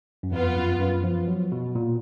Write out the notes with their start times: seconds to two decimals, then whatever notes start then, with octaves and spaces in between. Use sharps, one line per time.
0.23 F#2
0.31 F2 B3 F4 B4
0.55 F#2
0.79 F#2
1.04 F3
1.28 F#3
1.52 B2
1.75 A#2